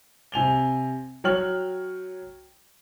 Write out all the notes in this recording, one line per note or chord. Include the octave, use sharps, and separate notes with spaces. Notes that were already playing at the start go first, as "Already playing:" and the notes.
C3 G#5 F7 G7
F#3 C#5 G5 F6 F#7